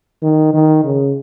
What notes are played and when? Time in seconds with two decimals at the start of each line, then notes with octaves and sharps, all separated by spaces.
0.23 D#3
0.54 D#3
0.84 C#3